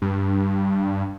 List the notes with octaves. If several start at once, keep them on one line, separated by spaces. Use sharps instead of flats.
G2